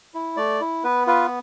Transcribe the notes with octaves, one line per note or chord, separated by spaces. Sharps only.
E4
A3 D5
E4
B3 B4
F4 B4